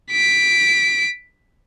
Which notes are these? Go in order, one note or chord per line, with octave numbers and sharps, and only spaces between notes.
B6 D7